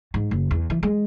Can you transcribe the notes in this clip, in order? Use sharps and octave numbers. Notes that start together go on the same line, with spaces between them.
G#2
F#1
E2
E3
G#3